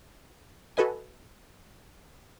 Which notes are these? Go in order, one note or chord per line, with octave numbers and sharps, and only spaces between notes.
F#4 A4 B4 D#5 G#5